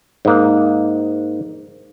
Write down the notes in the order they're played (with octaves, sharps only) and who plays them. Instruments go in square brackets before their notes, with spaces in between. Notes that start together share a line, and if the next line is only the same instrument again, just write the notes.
[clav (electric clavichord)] G#2 A#3